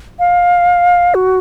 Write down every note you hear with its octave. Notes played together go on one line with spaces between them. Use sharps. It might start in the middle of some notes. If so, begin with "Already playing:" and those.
F5
F#4